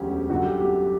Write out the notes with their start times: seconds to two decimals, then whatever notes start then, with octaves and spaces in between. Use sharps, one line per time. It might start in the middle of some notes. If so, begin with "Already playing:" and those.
Already playing: E1 D2 D3 F#3 C#4 G4
0.29 G1 F#2 D3 F#4
0.45 G4
0.60 G4